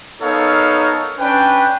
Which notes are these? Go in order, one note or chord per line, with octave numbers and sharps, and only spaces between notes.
B3 D#4 A4 A#4 C#5 F5
C#4 D4 B4 G5